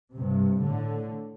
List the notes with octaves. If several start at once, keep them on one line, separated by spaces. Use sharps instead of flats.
G2 C3
A2 D3